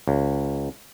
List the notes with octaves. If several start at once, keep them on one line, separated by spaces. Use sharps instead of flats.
C#2